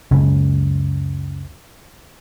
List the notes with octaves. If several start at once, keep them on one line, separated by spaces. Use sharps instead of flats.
C#2 F#2 C#3